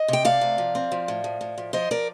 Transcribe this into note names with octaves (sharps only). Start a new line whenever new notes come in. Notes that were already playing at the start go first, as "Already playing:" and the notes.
Already playing: D#5
C3 G5
A3 D5 F5
C3
F3
C4
F3
A2
F3
A2
F3
F3 C5 D#5
F3 A#4 D5